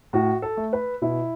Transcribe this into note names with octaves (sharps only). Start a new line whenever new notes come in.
A2 F#4
A4
A3
B4
B2 E4